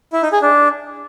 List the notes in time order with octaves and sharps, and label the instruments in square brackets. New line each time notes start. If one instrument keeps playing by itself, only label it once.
[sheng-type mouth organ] E4
D#4
G#4
D4